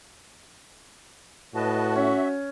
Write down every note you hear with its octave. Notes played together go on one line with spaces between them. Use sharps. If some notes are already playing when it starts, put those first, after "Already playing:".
A2 F#4 B4 D#5 A5
C#4 E5